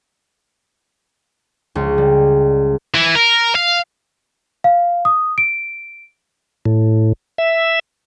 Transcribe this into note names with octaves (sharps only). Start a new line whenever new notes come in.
C#2
G3
E3
A#4
F5
F5
D#6
D7
A2
E5